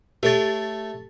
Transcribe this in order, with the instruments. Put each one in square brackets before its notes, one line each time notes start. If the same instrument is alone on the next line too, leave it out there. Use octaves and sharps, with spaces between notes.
[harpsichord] A3 C#5 [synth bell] G4 A4 A6